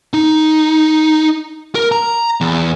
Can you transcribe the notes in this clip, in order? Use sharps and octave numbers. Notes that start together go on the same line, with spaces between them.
D#4
A#4
A#5
E2